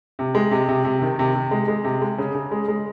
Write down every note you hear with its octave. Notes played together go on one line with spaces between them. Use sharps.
C3
G#3
C3
C3
C3
D#3
C3
C3
G#3
G#3
C3
G#3
C#3
C#3
G#3
G#3